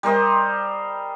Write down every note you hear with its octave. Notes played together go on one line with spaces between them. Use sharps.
G3 A#4 C5 D#5